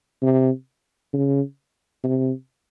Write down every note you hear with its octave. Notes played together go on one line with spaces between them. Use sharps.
C3
C#3
C3